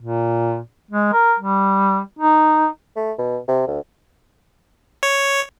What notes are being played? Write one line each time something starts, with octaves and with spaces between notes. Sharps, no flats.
A#2
G#3
A#4
G3
D#4
A3
B2
C3
D2
C#5